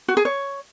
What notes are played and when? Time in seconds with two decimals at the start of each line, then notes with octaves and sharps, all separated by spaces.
0.08 F#4
0.17 G#4
0.25 C#5